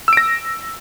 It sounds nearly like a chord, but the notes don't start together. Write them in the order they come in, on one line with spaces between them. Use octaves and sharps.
E6 D7 A#6